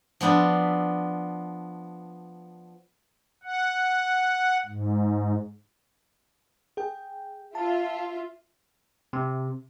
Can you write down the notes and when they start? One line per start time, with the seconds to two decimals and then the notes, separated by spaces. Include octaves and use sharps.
0.21 F3 B3 D4 B4 E5
3.43 F#5
4.66 G#2
6.77 G#4 G5
7.55 F4 E5 A5
9.13 C3